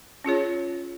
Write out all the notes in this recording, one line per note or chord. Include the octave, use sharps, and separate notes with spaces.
C#4 F4 G#4 C#5